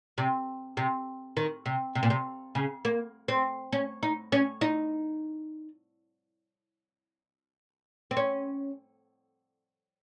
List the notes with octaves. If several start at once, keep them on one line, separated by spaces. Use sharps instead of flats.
C3
C3
D#3
C3
C3
A#2
C3
C#3
A#3
C4
C#4
D#4
C#4
D#4
C4
C#4